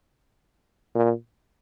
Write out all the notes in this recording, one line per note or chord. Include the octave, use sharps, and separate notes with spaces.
A#2